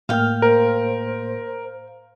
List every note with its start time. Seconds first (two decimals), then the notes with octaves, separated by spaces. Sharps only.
0.09 A2 A#3 F5 G5 F6
0.42 A#4 C5